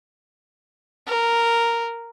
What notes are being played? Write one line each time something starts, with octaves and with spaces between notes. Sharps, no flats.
A#4